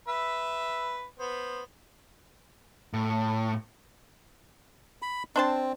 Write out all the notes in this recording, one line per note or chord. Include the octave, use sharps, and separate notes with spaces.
B4 E5
B3 C5
A2
B5
C4 D4 C5 A5